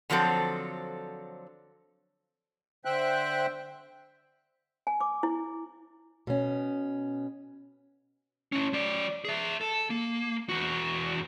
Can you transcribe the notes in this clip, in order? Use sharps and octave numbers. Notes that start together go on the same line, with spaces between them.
D3 F3 F#3 C4 A4
D3 C5 E5 G5 F#6
G#5
D6
E4
B2 C#4
C#4 E4
F#3 D5
G#4 E5
A4
A#3
E2 F#4